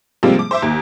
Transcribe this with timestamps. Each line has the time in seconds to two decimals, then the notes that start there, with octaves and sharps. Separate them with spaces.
0.23 C3 F3 G3 G#3 A#3 C4
0.39 D6
0.51 C5 E5 D6
0.62 D#2